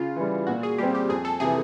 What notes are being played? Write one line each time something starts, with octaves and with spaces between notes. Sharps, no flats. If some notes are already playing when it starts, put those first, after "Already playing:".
Already playing: C#3 F4
E3 G3
A#2 F#4
G#4
G3 C4 G4
G4
F2 G#4
A4
C3 E3 G#4